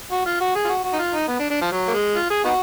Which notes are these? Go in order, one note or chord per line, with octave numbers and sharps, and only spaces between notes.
F#4
F4
F#4
G#4
F4
F#4
F#4
D#4
F4
D#4
B3
D4
D4
F3
F#3
A#3
G#3
F4
G#4
B3 D#4 F#4